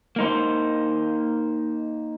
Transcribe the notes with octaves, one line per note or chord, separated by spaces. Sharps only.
A#3 D#4 C5